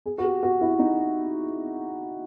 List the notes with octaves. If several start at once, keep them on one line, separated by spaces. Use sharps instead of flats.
G#4
F#4
G4
F#4
E4
D#4